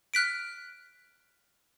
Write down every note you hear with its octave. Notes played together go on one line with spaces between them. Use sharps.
F6 F#6 B6 D7